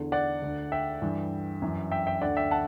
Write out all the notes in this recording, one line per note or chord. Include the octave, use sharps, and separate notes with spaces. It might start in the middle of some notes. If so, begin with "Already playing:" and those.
Already playing: E2 D3
D5 F#5
D2 D3
E5 G5
G2 E3
F#2 E3
E5 G5
E5 G5
D2 D3 D5 F#5
E5 G5
F#5 A5